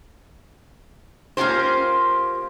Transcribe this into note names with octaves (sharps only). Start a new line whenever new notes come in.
A#3 C#4 F4 G4 C5